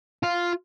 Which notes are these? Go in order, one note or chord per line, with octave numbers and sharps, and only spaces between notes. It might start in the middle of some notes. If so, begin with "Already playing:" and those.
F4